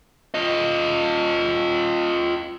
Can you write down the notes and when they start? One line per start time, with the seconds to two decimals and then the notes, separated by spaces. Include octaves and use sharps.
0.34 F4 D#5